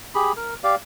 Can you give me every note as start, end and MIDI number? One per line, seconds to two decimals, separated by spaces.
0.15 0.32 67
0.15 0.32 68
0.15 0.32 83
0.37 0.54 70
0.64 0.75 67
0.64 0.75 74
0.64 0.75 77